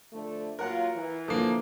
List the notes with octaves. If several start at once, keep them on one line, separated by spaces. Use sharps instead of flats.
D3 F3 A3
F#3 A#3 F4 A#4 F#5 A#5
E3
D3 F3 A#3